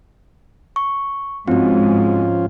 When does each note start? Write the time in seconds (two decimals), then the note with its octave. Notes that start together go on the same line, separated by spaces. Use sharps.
0.76 C#6
1.48 G#2 F3 C4 C#4 F4 F#4